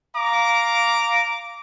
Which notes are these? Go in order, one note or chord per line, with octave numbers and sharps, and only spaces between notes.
F5 A#5 D6